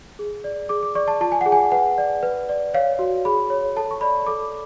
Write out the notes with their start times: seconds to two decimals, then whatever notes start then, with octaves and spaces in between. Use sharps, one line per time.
0.19 G#4
0.44 D5
0.69 G#4 D6
0.83 D6
0.95 D5 C#6
1.08 A5
1.21 F4 A5
1.32 G#5
1.41 G#4 F#5
1.52 G#5
1.72 B4 F#5
1.98 D5
2.23 B4
2.49 D5
2.74 C#5 F5
2.99 F#4
3.25 G#4 B5
3.50 C#5
3.76 A4 A5
3.91 C#6
4.01 D5 B5
4.27 A4 D6